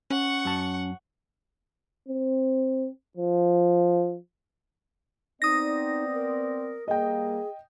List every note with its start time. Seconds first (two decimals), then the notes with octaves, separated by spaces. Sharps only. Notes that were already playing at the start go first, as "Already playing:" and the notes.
0.11 C#4 F#5 C#6
0.45 F#2 A5
2.08 C4
3.17 F3
5.42 B3 C4 D#4 D5 D#6 A#6
6.13 A#4
6.88 G3 A#3 G#4 D#5 G5